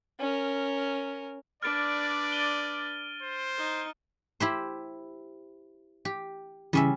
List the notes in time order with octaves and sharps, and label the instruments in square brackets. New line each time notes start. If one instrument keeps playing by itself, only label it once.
[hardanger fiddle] C#4 A#4
[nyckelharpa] D4 B4 [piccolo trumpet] D5 [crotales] F6 A6 D7
[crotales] D#7 G7
[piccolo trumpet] C5
[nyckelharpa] D#4
[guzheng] E4 G4 C5
G4
[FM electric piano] C#3 E3 [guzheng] G3 C#4 E5